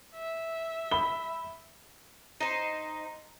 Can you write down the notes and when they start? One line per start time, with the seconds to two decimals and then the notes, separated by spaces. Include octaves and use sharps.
0.16 E5
0.91 B5 G7
2.40 D#4 C5